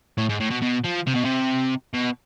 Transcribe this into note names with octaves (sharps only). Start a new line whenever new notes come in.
A2
G#2
A2
B2
B2
F3
C3
B2
C3
B2